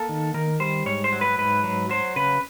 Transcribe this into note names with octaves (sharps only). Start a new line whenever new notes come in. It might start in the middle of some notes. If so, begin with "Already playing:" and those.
Already playing: A#3 A4
D#3
D#3 A#4
G3 C5
G#2 C#5
C5
F#3
B4
G#2 B4
F#3
F#3 C5
C#3 B4